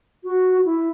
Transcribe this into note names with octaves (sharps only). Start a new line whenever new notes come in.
F#4
E4